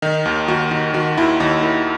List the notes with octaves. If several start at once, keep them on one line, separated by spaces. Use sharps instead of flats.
D#3 D#4
D#2
D#2 F#4
D#3
D#3 F#4
D#2 E4
D#2 D#4
D#3 E4